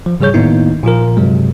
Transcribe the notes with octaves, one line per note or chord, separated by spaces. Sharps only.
F3
G#2 C#3 G3 G#4 C#5 G6
A2 D#3 A#3 B3 D#4 E4
A#2 F3 F4 A#4
G2 C3 F#3 G#3